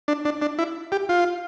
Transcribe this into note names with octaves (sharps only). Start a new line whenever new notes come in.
D4
D4
D4
E4
G4
F4